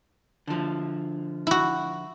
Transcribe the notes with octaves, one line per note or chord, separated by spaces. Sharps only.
D3 F3
E4 F#4